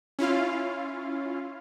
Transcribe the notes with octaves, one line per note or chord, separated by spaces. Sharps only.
C#4 E4 F4 F5